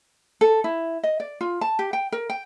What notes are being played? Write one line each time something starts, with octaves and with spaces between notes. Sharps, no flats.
A4
E4
D#5
D5
F4
A5
G4
G5
A#4
G5